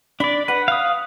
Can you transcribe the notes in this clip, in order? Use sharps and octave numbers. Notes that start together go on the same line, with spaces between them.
D4 D5 B5
B4 F#5
F5 D#6